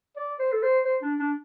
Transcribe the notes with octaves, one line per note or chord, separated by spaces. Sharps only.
D5
C5
A4
C5
C5
D4
D4